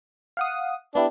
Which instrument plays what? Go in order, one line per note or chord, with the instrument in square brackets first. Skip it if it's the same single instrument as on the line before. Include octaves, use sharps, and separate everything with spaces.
[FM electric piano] F5 F#5 D#6
[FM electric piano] B3 E4 G4 [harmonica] D4